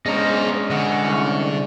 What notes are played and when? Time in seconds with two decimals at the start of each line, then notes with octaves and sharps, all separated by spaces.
0.06 G#3 B3 C#4 D4 C5 D#5 A#5
0.70 D3 D#5 F#5
1.04 C2